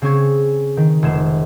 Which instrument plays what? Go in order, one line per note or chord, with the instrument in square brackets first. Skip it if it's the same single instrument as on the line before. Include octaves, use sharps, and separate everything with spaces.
[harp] C#3 C4 C#4 G#4 C#6 G#6
D#3
F1 G#3 E7